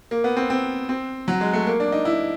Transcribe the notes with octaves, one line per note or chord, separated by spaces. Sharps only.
A#3
B3
C4
C4
C4
F#3
G#3
A3
A#3
D4
D#4
E4